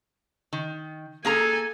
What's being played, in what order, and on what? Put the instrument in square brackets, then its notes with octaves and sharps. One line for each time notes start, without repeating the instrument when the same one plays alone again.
[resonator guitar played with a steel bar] D#3
[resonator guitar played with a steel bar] A#3 G#4 A#5 [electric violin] A4 G#5